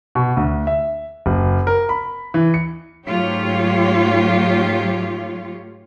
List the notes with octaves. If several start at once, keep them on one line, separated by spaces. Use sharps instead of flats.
B2
D2
E5
F#1
A#4
B5
E3
C#7
G#2 F#3 A3 F4 G4 C#5